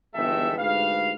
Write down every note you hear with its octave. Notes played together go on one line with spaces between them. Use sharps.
G1 E2 D#3 G#3 A4 E5
D2 G#2 G4 B4 F5